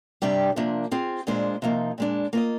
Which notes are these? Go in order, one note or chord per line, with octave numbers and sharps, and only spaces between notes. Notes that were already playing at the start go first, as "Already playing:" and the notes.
C3 G3 D4 G4 D5
C3 F3 A#3 D4
C4 F4 G#4
A#2 G#3 D4 F4 C5
C3 F3 A#3 D#4
A#2 G#3 D4
A#3 F4 C5 D#5